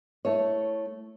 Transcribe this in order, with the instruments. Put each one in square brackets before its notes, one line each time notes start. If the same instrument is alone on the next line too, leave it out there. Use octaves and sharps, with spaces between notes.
[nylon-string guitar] A3 E4 C#5